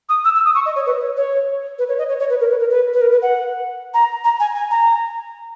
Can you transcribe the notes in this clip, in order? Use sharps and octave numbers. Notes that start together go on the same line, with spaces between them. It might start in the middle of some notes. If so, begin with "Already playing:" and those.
D#6
E6
E6
D#6
C#6
D#5
C#5
B4
C#5
C#5
B4
C#5
D#5
C#5
C#5
B4
A#4
B4
A#4
B4
B4
A#4
B4
F#5
A#5
A#5
G#5
G#5
A#5